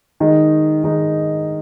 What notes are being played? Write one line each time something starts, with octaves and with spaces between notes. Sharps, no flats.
D#3 G#3 D#4
D#3 G#3 D#4